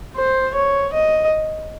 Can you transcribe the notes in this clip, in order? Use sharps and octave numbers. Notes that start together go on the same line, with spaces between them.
C5
C#5
D#5